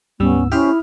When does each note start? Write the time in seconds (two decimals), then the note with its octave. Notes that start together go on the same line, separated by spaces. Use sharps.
0.20 D2 G#2 G3 B3 C#4 E6
0.52 C#4 E4 G4 C5 E5 D#6 F6